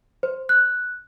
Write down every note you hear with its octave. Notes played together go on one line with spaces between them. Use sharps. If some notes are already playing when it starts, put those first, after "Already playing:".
C5
F#6